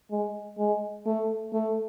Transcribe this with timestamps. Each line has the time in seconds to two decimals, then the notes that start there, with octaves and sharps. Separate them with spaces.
0.11 G#3
0.58 G#3
1.06 A3
1.53 A3